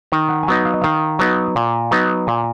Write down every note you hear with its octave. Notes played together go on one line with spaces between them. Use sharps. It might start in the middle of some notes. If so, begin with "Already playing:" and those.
D#3 A#5
F#5
G#5
F#3 B3 D#4 F#5
F5
D#5
D#3 F5
F#3 B3 D#4
A#2
F#3 B3 D#4
A#2 G#5